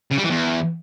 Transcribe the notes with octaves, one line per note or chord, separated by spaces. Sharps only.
C#3
G3
E3
E2